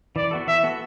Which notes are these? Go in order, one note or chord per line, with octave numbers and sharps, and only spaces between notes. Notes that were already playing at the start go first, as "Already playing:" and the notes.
E3 D5
B3 F#4 A4
E3 E5
B3 F#4 A4